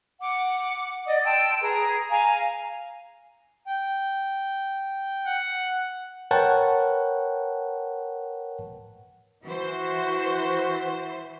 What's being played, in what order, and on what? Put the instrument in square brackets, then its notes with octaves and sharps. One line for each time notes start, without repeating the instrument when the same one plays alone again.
[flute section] F#5 D6
D5 D#5 D#6
G5 A5 C6 E6
G#4 B4 A#5 D#6
F5 G#5 A#5
[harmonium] G5
[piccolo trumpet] F#5
[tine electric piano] A#4 B4 C#5 F#5 G5 A5
[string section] E3 C5 [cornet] F#4